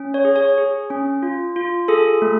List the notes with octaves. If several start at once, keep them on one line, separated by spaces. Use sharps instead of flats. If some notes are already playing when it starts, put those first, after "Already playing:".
Already playing: C#4
C#5
G#4
C#5
G#4
C#4
F4
F4
G#4 A4
A3